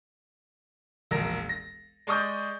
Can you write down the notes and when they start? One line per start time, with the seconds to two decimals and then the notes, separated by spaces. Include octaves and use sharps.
1.11 E1 A#1 A#4 A#6
1.49 A#6
2.07 G#3 D5 C#6 D#6 G6